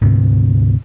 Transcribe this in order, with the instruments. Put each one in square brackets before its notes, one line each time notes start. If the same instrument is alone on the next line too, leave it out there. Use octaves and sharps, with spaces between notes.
[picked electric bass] D2 G#2 C3 C4